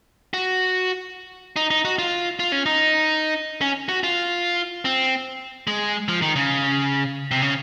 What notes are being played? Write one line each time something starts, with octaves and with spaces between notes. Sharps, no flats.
F#4
D#4
D#4
F#4
F4
F4
C#4
D#4
C#4
F#4
F4
C4
G#3
F3
D#3
C#3
C3
C#3